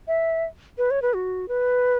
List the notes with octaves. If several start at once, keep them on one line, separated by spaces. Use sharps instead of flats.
E5
B4
C#5
B4
F#4
B4